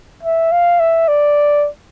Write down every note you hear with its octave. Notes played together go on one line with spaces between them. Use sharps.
E5
F5
E5
D5